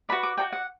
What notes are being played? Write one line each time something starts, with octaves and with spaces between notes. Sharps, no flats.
F#4 B4 D5 B5
D6
F#4 A4 D5 G5
F#5